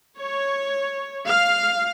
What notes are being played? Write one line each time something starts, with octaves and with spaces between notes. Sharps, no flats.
C#5
F5